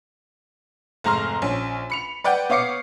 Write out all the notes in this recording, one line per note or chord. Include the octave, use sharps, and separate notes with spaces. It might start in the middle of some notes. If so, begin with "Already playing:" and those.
F1 G#2 A#5 C6 F6
A#1 C#4
B5 C#7 F7
B4 D5 F#5 G5 G6
B3 C#5 F5 D6 C7 C#7